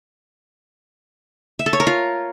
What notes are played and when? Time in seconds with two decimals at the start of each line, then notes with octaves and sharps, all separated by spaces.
1.59 E5
1.66 A4
1.73 C#5
1.80 A#4
1.87 F4